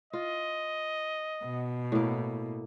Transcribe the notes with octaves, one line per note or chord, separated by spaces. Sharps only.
F4 D#5
B2
A2 A#3